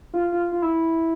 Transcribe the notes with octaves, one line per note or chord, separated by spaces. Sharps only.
F4
F4
F4
E4